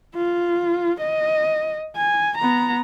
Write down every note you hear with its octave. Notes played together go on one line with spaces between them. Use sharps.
F4
D#5
G#5
B3 A#5